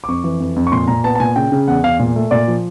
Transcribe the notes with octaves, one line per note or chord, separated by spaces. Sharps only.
D6
F2 C#6
E3
F2
F2
C#6
A#2 C6
A#2 A#5
B3 A5
A5
A#2 G#5
C#3 G5
C#3
E2 F#5
E2 F5
A#2
A3
A#2 D5
F3